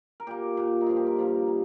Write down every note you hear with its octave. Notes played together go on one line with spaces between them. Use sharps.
A#4
A#2 A#3 G4
A#2 A#3
D#4
G2 F3 A#3 F4
G4
A#4
G2 F3 A#3
G3 A#3